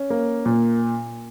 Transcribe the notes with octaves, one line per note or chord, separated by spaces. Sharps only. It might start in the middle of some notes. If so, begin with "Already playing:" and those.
Already playing: C#4
A#3
A#2